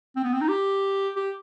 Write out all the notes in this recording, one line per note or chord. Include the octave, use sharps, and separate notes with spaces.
C4
B3
C4
D#4
G4
G4